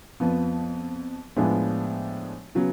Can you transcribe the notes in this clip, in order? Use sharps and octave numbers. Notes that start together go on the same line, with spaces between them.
F2 F3 B3
A2 F3 G#3 B3 D4
C#3 F#3 B3